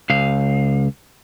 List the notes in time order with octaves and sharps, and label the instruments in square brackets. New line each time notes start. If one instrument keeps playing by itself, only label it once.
[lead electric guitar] C#2 F5